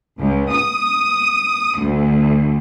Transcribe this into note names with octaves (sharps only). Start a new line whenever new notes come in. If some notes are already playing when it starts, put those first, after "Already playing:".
C#2
D#6
D2